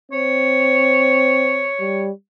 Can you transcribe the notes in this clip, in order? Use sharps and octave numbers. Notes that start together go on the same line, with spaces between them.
C4 C#5
G3